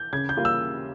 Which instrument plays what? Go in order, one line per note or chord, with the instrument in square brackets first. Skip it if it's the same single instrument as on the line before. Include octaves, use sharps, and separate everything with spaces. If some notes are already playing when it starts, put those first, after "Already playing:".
Already playing: [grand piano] G6
[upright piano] C#3 [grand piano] G#6
[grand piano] G6
[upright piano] G3 A#3 F4
[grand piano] E6